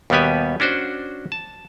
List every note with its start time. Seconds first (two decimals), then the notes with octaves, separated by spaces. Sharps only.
0.10 D#2 B2 G3 B3 G4 G#5
0.60 C#4 D4 F#4 C5
1.32 A5